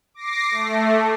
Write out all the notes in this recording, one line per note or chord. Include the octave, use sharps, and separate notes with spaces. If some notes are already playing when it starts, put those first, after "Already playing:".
D6 A#6 C7
A3